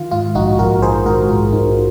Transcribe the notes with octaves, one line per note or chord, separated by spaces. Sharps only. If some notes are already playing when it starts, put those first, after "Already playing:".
Already playing: D#3 F4
G#2 F4
A#1 D#4 F#4
A#1 F#4 A#4
D#3 G#4 C5
G#2 F#4 A#4
A#1 F4
A#1 D#4